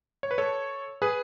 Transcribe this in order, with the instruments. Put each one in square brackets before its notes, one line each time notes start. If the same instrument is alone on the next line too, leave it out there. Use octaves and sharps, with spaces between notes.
[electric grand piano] C#5
B4
A4 C#5
G#4 B4